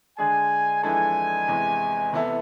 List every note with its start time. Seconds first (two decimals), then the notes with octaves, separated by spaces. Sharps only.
0.18 D3 G#3 D4 G#4 G#5
0.83 F2 E3 G#3 D4 A4 G#5
1.48 E2 C3 G#3
2.13 C3 E3 B3 E4 A4